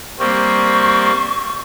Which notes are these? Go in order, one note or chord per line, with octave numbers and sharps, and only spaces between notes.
G3 A#3 C4 C#6